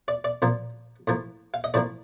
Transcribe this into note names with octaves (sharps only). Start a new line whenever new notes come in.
D5
D5
A#2 F3 A#3
A2 F3 A#3
F5
D#5
A2 F3 A#3 D5